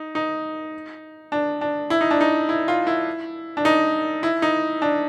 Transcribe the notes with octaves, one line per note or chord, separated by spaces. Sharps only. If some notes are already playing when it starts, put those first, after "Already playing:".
Already playing: D#4
D#4
D4
D4
E4
D#4
D4
D#4
E4
F4
E4
D4
D#4
E4
D#4
D4